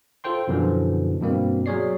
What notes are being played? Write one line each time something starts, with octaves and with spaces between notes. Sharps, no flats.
F4 A4 C5 G5 C6
F#2 B2 D3 E3 F3
G2 B2 A#3 C4
F#3 G#4 C#5 D5 C7